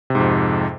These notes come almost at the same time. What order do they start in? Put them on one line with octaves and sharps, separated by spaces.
C3 G#2 F2